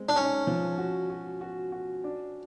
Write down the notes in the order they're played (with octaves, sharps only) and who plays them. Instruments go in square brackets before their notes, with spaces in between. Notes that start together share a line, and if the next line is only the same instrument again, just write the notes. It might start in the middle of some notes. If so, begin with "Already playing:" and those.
Already playing: [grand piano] G#3 C4
[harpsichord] D4
[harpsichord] C#4 [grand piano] D#4
[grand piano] F3
F#4
F#4
F#4
F#4
D4